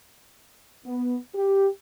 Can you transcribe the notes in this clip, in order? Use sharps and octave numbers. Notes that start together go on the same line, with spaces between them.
B3
G4